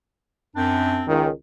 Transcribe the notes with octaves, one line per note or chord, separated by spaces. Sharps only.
F#2 C4 D4
C#2 D#3